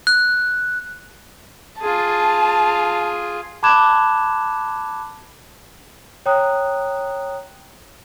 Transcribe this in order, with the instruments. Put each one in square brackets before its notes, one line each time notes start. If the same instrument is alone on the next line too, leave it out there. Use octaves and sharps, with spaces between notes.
[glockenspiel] F#6
[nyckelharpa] F4 G#4 [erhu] A5
[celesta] A5 B5 D6 F#6 G#6 E7
C#5 G5 A#5 D#6 F#6